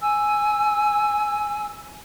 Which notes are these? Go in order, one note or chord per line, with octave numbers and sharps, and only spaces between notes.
G#5 E6